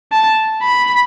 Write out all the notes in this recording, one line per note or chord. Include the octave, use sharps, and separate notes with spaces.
A5
B5